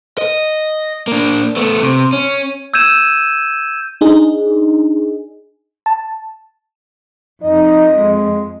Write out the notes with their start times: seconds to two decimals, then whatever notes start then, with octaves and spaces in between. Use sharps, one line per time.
0.18 D#5
1.08 A#3 D4
1.57 A3 B3
1.83 C3
2.13 C#4
2.74 E6 G6 G#6 D#7 E7
4.01 D4 D#4 G#4
5.86 A5
7.43 F2 D#4 D#5
7.94 G#3